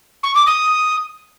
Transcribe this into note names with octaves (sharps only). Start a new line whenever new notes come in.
C#6
D6
D#6